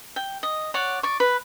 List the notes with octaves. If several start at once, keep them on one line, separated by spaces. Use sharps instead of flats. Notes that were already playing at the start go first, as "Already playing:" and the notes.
G5
D#5
C#5 D5 F#5
D5 C#6
B4